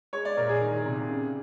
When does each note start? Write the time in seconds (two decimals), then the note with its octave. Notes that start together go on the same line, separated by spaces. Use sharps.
0.13 G#3 C#5
0.25 D5
0.37 A#2 A#4
0.49 G#4
0.61 D#3
0.86 C3
1.10 C#3